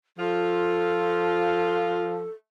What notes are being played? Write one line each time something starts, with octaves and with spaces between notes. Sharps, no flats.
F3 F4 A4